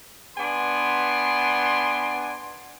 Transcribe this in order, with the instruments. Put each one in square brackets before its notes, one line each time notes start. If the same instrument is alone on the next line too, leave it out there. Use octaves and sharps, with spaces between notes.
[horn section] B3 D4 G#5 C6